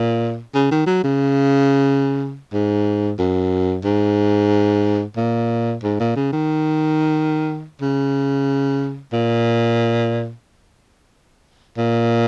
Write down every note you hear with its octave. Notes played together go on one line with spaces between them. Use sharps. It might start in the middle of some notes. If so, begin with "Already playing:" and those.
Already playing: A#2
C#3
D#3
F#3
C#3
G#2
F#2
G#2
A#2
G#2
A#2
C#3
D#3
C#3
A#2
A#2